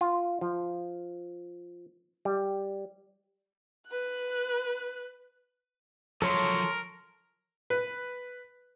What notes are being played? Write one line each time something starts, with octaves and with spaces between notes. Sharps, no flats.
F4
F3
G3
B4 F#6
F3 F#3 A4 A#4 C#5 C6
B4